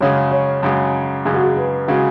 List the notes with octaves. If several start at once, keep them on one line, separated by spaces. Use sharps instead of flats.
F#2 C#3 G#3 C#5
C#5
F#2 C#3 G#3
F#2 C#3 G#3 G#4
F#4
G#4
B4
C#3 G#3 F#4